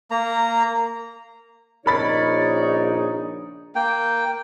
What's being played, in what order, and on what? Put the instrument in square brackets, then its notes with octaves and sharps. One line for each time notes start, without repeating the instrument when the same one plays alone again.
[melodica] A#3 A#5
[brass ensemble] A#1 C#3 D#4 [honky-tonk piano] A#4 B5 A6 [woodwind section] C#5 D5
[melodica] A#3 G5